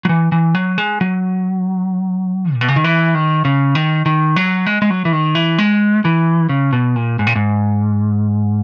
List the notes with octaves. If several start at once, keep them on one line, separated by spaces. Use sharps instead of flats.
F#3
E3
E3
F#3
G#3
F#3
A#2
B2
C#3
D#3
E3
D#3
C#3
D#3
D#3
F#3
G#3
G#3
F#3
E3
D#3
E3
G#3
E3
C#3
B2
A#2
G#2
A#2
G#2